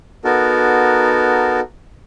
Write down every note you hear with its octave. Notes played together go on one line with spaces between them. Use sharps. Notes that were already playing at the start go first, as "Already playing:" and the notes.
B3 D#4 F#4 A4 A#4